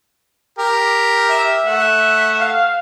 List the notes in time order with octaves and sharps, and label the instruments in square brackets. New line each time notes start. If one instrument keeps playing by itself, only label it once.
[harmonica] G4 A#4
[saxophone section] E5
[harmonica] A3 F#5
[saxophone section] F5